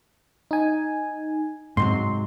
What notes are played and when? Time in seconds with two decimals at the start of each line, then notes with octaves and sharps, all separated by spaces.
0.51 D#4 G#5
1.77 G#2 C3 F#3 C6